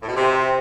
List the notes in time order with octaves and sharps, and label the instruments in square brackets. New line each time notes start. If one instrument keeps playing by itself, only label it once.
[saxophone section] A2
B2
C3